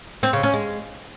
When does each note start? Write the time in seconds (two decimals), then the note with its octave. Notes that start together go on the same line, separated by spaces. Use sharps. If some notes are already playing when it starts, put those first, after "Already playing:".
0.23 C4
0.33 C#3
0.43 C#4
0.54 G#3